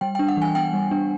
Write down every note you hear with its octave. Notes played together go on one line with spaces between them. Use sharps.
G3 G5
D4 G5
F#5
E3 G#5
B3 G5
G3
D4